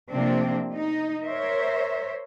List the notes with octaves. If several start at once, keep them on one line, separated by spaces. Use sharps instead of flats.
C3 F3 A3 A#3 C4 D4
D#4
A#4 C5 C#5 E5